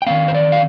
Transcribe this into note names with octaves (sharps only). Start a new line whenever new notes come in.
G5
D#3 G#3 C4 F5
C5
D5
F5